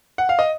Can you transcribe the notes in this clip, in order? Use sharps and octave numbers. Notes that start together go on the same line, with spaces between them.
F#5
F5
D#5